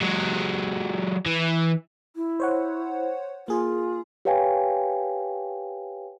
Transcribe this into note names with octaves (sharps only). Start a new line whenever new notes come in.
F#3 G#3
E3
E4
C5 C#5 F#5
A#3 F4 G#4
G4 B4 C#5 F5 G5 G#5